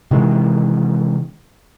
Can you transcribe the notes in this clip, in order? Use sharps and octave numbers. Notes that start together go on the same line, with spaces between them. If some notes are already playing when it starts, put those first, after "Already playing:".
C3 D#3 E3 G#3